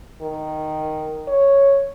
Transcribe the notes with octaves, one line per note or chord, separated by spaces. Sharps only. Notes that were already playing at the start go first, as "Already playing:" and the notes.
D#3
C#5